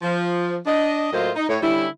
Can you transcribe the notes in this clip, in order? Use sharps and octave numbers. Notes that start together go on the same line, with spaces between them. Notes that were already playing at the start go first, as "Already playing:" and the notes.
F3
D4 D#5
A2 F#3 A#3 F4 C5 D#5
D#4
A2 C#5
D3 G3 C#4 E4